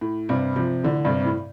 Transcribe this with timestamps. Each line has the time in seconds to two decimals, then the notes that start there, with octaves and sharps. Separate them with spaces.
0.01 A2
0.29 G2 C3
0.56 C3 F3
0.83 A2 D3
1.05 G2 C3
1.20 C3
1.25 A2